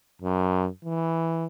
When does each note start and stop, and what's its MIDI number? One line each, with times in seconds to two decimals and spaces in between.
0.22 0.68 42
0.84 1.46 52